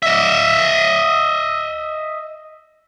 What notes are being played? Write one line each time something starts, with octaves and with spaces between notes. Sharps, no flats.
D#5 E5